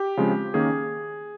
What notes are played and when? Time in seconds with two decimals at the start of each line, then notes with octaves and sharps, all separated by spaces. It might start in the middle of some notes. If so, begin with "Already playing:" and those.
Already playing: G4
0.17 C#3 F3 G#3 C4
0.54 D#3 A#3 C#4 G#4